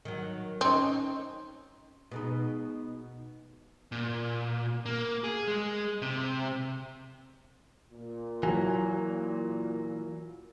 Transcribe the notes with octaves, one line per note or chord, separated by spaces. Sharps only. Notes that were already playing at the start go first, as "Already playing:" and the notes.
D#3 F#3
C4 C#4 D#4
B2 G#3 D#4
A#2
A#3
G#4
G#3
C3
A#2
E3 F#3 A#3 G#5